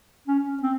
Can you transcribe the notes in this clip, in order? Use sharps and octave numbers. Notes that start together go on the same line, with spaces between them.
C#4
C4